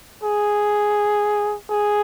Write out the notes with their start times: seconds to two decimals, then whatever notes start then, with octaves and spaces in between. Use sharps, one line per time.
0.24 G#4
1.70 G#4